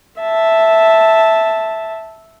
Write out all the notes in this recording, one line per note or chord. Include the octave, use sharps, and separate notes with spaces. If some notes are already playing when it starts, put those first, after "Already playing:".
E5 A5